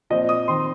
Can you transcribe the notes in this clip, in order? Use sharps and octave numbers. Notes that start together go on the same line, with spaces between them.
A#2 F3 C4 D#5
D#6
D#3 C4 C6